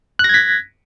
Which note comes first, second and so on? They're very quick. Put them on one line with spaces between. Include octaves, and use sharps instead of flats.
F#6 A#6 G#6 B6